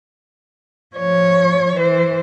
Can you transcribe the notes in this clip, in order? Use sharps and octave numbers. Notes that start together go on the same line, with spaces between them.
F3 C#5
E3 C5